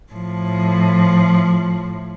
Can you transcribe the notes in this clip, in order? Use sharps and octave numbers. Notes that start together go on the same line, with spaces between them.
A2 F3